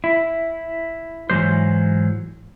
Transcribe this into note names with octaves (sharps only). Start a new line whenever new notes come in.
E4
G#2 E3 F#3 G3 C5